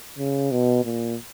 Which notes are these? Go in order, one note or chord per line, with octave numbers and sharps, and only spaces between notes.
C#3
B2
A#2